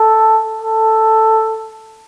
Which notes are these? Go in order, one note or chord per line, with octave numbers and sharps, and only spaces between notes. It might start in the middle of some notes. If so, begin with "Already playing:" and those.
Already playing: A4
A4